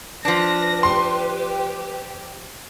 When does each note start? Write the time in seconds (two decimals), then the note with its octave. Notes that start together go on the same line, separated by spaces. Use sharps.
0.25 F3 D4 B4 A#6
0.83 G4 C6